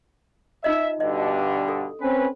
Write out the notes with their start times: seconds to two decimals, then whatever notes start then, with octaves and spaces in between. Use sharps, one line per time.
0.64 D#4 F4 D#5 E5
1.00 G2 B2 D3 D#5
1.68 A4
2.01 C4 C#4 B4